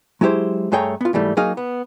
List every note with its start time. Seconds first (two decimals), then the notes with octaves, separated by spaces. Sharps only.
0.21 F#3 G#3 E4 G4 C5
0.72 G2 A3 G#4 C#5 G5 A#5
1.01 B3 F4
1.13 G#2 E3 G3 A3
1.37 F#3 A#3 D#4 G#4 F5
1.57 B3